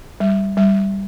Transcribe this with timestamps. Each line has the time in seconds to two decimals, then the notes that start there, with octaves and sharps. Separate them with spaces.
0.20 G3
0.57 G3